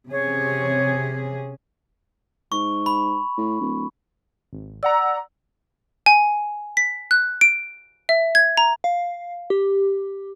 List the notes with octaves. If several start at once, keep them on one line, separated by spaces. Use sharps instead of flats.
C3 C#4 G#4 C#5
G#2 C#6
B5
A2
D1
G#1
D5 F#5 A#5 E6
G#5
B6
F#6
D7
E5
G#6
A#5
F5
G4